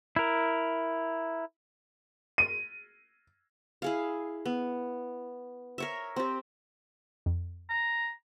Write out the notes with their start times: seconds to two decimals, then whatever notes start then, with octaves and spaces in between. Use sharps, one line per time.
0.16 E4 A#4
2.38 D#7
3.82 E4 G#4 F5
4.45 B3
5.78 A#4 C#5 E5
6.16 C4 G4
7.26 F2
7.70 A#5